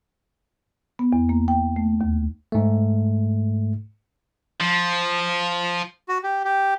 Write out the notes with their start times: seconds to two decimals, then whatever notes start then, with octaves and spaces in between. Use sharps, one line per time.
0.99 B3
1.13 E2
1.29 A#3
1.48 G5
1.76 A3
2.01 D#2
2.52 G#2 A3
4.61 F3
6.08 F#4
6.23 G4
6.45 G4